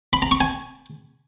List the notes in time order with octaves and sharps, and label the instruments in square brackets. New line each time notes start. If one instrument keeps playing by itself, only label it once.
[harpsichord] B5
A#5
C#6
G#5